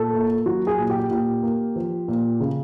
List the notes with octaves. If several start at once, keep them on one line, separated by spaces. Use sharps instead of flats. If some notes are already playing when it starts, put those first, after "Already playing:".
Already playing: A#2 A4
A#3
F#3 F#4
G#4
A#2
G4
A#2 G4
A#3
F3
A#2
C#3